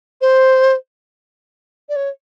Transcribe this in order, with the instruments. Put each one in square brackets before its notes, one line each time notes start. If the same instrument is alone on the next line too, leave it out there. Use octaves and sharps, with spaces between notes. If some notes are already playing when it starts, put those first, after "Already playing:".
[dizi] C5
D5
C#5